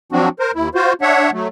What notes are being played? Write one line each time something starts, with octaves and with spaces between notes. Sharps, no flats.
F3 F#3 C4 D4 F#4
A#4 C5
D#2 E4
F4 F#4 C5
D4 C#5 E5 F#5
F#3 A3